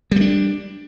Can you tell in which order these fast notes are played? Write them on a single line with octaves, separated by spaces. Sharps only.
G3 A3 D4